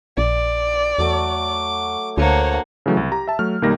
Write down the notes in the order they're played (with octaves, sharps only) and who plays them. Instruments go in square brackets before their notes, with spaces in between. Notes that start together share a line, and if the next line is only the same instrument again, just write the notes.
[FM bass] A#1 [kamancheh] D5
[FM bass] E2 [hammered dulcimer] F#3 A3 F#4 [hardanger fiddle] D6
[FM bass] D2 [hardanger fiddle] A#3 F#5 [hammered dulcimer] D4 [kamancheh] C5 C#5
[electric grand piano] C#3 E3 F#3 A3
C2
G4 A#5
E5 A5
F#3 A3 F6
B1 D#3 G3 A#3 A#6